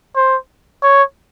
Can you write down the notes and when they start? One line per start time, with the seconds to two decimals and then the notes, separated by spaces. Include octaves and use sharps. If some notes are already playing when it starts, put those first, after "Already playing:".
0.16 C5
0.83 C#5